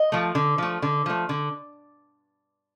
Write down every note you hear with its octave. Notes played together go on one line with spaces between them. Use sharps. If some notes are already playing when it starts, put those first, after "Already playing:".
Already playing: D#5
F3 A3
D3
F3 A3
D3
F3 A3
D3